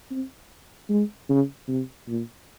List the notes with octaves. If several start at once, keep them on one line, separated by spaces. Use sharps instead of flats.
C4
G#3
C#3
C3
A#2